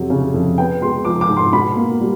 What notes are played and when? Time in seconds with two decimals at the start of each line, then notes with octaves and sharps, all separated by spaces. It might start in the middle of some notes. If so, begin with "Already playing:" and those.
Already playing: F2 C3 F#3
0.10 C#3
0.34 F2
0.58 B3 G5
0.82 G#3 C6
1.05 F3 D6
1.21 D6
1.29 G#2
1.37 C6
1.53 B2 B5
1.76 A#3
2.00 G3